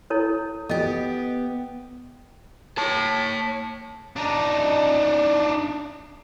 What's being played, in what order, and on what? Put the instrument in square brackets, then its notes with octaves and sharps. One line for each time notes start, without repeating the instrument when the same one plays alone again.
[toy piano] E4 A4 C#5
[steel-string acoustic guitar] B3 G4 [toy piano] A4 D#5
[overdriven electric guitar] C#5 A5
[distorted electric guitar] D4 D#4